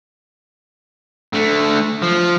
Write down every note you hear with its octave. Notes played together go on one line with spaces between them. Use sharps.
D3 A3
F3